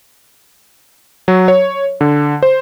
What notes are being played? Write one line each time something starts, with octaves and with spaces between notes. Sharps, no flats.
F#3
C#5
D3
C5